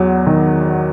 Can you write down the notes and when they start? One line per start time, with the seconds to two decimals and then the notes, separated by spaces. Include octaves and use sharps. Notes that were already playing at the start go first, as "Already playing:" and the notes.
Already playing: E2 F#3
0.26 D#3